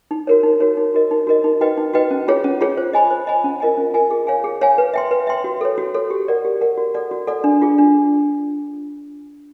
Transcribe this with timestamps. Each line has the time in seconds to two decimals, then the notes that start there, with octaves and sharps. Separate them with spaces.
0.11 D#4
0.27 F#4 A#4 C#5
0.43 D#4
0.60 F#4 A#4 C#5
0.77 D#4
0.94 F#4 A#4 D#5
1.11 D#4
1.27 F#4 A#4 D#5
1.44 D#4
1.61 F#4 B4 D#5 G5
1.77 D#4
1.94 F#4 B4 D#5 G5
2.11 C#4
2.28 F4 G#4 C#5
2.44 C#4
2.61 F4 G#4 C#5
2.78 C5
2.93 D#5 G#5 B5
3.11 C5
3.27 D#5 G#5 B5
3.44 C#4
3.60 F4 A#4 D#5 G#5
3.77 C#4
3.94 F4 A#4 D#5 G#5
4.10 G#4
4.27 C#5 F5 G#5
4.44 G#4
4.61 C#5 F5 G#5
4.78 B4
4.94 E5 G5 C6
5.11 B4
5.27 E5 G5 C6
5.44 F#4
5.61 A4 C#5
5.78 F#4
5.94 A4 C#5
6.10 G4
6.28 A#4 D5 F#5
6.45 G4
6.61 A#4 D5 F#5
6.77 F#4
6.94 A4 D5 F#5
7.11 F#4
7.27 A4 D5 F#5
7.44 D4
7.61 F4 G#4
7.78 D4